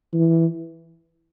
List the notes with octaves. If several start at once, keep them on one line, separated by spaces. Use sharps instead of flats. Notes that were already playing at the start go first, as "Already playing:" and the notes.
E3